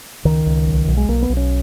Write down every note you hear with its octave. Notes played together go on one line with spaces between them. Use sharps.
C#2 D#3
C#2
B1
B1
G#3
B1 A#3
B3
B1
C#4